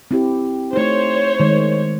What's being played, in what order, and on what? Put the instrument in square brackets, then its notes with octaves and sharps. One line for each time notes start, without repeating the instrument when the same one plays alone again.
[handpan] C4 E4 G4
[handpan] A3 D#4 [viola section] C5 C#5
[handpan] D#3 G#3